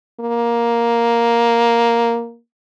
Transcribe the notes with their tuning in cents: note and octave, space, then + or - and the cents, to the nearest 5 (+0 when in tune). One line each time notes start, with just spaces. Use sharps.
A#3 +5